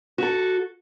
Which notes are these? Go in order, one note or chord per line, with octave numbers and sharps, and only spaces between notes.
F#4 A4